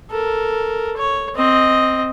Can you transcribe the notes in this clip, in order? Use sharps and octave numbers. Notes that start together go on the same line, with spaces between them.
A4 A#4
C#5
C4 D#5